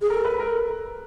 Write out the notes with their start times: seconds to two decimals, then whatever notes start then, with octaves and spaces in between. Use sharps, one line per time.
0.01 G#4
0.10 A4 A#4
0.25 B4
0.40 A#4